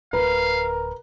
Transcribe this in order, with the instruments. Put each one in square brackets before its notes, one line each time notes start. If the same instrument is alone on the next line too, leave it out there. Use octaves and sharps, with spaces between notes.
[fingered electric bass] D1 [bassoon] A#4 [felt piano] B4 [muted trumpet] F5